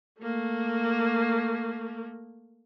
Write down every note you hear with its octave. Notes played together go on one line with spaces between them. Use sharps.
A3 A#3